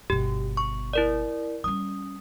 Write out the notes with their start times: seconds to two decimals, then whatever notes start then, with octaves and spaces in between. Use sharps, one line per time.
0.10 G1 B2 G4
0.57 C#6
0.93 E4 A#4 D5
1.64 G3 C#4 D#6